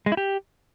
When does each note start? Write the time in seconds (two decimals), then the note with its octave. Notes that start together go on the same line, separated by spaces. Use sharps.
0.06 G#3
0.12 E4
0.17 G4